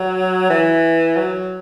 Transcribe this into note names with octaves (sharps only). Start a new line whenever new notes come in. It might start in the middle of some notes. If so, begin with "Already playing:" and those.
Already playing: F#3
E3
F#3